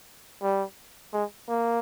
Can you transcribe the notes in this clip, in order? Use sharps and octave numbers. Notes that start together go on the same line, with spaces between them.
G3
G#3
A#3